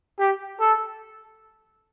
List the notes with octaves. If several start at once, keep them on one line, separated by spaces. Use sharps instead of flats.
G4
A4